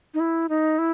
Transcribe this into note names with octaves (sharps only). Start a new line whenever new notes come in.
D#4
E4
D#4
E4